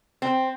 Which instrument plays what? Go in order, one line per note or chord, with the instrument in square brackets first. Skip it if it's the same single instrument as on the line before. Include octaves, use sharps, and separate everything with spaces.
[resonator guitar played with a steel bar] C4